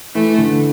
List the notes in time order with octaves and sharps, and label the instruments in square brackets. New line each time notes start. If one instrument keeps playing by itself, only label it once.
[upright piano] E3 [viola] A3
[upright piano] D3